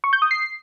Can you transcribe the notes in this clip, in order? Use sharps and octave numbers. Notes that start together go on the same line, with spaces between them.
C#6
G6
D#6
C7